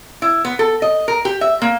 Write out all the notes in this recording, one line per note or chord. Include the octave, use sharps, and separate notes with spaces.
E4
B3
A4
D#5
A#4
G4
E5
A#3